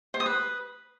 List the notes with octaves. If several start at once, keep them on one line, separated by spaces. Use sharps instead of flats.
C5
D#6
B4